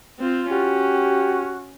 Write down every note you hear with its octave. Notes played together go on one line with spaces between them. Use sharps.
C4 F4
C#4 F#4 G4